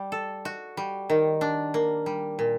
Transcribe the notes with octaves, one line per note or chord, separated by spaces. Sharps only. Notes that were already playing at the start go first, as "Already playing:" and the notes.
Already playing: G3
A4
F#4
G3
D#3
D4
A#3
G3
A#2